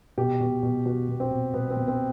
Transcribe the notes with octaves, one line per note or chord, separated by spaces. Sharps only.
B2 G4
B2
B2
B2 F#4
B2
C4
B2
B2 B3
C4
B2
C4